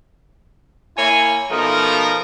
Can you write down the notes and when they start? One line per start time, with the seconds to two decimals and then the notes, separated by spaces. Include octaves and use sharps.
0.96 A#3 E4 C#5 G#5
1.50 B2 F3 A3 D#4 A#4